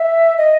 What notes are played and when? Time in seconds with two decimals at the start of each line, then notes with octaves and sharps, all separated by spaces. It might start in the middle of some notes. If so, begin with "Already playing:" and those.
Already playing: E5
0.38 D#5